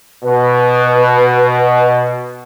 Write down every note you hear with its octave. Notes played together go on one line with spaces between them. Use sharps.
B2 B4